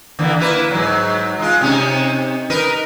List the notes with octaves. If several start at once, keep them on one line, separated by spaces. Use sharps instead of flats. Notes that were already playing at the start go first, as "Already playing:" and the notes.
D3 E3 A#3
A#3 E4 B4
G#2 F#3
G#3 F4
C3 C#4 D#4
D#4 A#4 B4